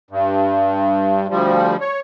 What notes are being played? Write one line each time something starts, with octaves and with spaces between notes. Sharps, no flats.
G2
D2 F3 G3
C#5